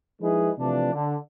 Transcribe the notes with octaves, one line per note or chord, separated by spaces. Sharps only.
F3 G#3 D#4 E4 G#4 B4
C3 E3 F3 A3 D4
D3